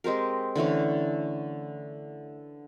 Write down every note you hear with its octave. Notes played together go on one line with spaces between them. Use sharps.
G#3 C4 G4 A#4
D3 E3 A3 C#4